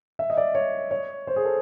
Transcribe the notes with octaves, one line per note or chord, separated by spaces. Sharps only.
E5
D#5
D5
C#5
C#5
C5
G#4
A4